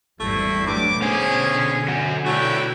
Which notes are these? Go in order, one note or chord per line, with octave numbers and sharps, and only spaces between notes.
G#1 E2 G3 A3 C4 E4
G2 F#3 A3 D6
B2 D3 B3 C#4 G#4 C5 G#5
F#3 F#5 G#5
A3 E4 F#4 B4 C#5 D5 G5